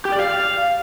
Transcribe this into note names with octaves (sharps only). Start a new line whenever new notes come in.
G4
D5
F5